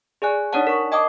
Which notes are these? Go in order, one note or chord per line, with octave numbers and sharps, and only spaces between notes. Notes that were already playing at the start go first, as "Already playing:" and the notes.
G#4 D5 G#5 F#6
D4 D#4 C#5 D5 F#5 A5
A#4 C#6
D#5 G5 A5 D6 D#6